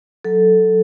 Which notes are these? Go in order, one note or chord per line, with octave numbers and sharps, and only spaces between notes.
F#3 A4